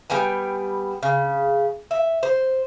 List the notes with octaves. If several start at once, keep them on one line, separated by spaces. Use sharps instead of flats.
G3 B3 G5 G#5
C#3
E5
C5